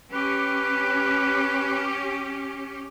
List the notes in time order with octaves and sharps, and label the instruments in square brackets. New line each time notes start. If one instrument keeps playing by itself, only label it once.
[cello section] C#4 G4 [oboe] B4